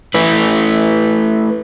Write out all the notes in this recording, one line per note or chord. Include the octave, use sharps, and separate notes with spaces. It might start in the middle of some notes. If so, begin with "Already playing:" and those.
A3 E4 B4